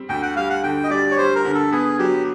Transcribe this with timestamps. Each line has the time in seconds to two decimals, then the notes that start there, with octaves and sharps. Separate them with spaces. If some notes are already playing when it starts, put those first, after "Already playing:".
Already playing: G3 C4
0.09 D2 G5
0.22 F#5
0.36 G3 F5
0.50 F#5
0.63 D3 G5
0.84 D#5
0.90 G3 D5
1.11 C#5
1.18 G3 C5
1.35 A#4
1.45 D3
1.54 A4
1.72 B3 G#4
1.99 F#3 G4